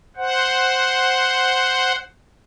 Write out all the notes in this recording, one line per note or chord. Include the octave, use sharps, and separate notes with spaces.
C5 F#5